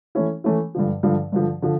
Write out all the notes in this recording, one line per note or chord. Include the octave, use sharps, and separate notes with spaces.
E3 A3 C#4 E4
E3 A3 C#4 E4
G2 D3 F3
G2 D3 F3
G2 D3 F3
D3 F3